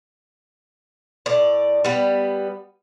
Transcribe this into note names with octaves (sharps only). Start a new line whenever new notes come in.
A2 D5
G3 B3